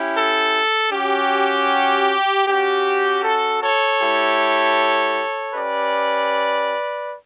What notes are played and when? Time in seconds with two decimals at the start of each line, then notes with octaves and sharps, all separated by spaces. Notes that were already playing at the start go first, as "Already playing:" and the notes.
Already playing: C#4 E4 G4
0.16 A4
0.93 C#4 F#4 G4
2.47 C#4 F#4 G4
3.23 A4
3.62 A4 C#5
4.00 A3 E4 G4
5.53 C#4 G4 B4 D5